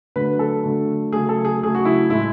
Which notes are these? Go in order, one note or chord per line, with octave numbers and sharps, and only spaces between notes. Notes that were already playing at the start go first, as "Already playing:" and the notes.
D3 F#3 A3 B4
A4
D3 F#3 A3
C#3 F#3 A3 G#4
A4
G#4
C#3 F#3 A3 G#4
F#4
E4
A2 G#3 E4